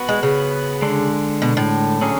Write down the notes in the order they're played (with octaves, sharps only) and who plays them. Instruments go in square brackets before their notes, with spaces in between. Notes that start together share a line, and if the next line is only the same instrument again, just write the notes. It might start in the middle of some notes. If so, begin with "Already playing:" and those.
Already playing: [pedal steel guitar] B3 F#4 B4
[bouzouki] G#3
C#3
[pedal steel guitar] D3 G#3 D4
[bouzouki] B2
A2
[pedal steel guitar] D3 F#3 C#4 G#4